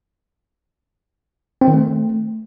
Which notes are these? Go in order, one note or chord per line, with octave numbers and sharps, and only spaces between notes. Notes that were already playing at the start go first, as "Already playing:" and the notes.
C4
D#3
A3